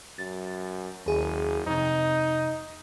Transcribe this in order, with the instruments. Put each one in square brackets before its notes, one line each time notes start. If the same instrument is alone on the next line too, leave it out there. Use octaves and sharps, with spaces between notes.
[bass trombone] F#2 [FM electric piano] A6
[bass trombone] F#1 [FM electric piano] D#2 G#4
[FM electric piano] F2 C3 [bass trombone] D#4